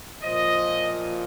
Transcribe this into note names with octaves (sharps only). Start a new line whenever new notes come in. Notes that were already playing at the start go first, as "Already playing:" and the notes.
A#2 F3 C5 D#5